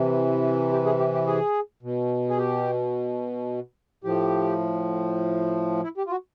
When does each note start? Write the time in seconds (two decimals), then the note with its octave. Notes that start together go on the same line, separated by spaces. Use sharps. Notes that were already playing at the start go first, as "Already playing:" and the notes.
Already playing: C3 E3
0.72 G4
0.86 G#4
0.99 G4
1.14 G4
1.27 G#4
1.83 B2
2.29 G#4
2.38 G4
4.04 A2 F3 G4
5.83 E4
5.98 G4
6.07 F4
6.11 F#4